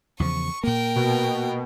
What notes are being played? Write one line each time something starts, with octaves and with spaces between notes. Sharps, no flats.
E2 C#3 F3 C#6
A#2 A#3 A#4 G5
B2